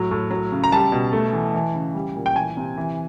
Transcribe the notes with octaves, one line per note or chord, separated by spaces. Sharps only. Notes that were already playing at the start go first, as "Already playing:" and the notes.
Already playing: A2 F#3
A2
F#3
C#3
A#5
G3 A5
B2
A3
E3
E3
C#3
G3
A#2
G5
E3 G#5
C3
E3